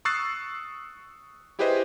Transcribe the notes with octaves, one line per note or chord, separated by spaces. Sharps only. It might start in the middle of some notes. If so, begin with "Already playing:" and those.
C#6 D#6 E6 F#6 A6 C7
E4 G4 G#4 B4 C5 D#5